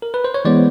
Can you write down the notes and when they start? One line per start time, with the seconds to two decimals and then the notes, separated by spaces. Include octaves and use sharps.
0.02 A#4
0.14 B4
0.24 C5
0.34 C#5
0.45 E3 G#3 B3 C5 D5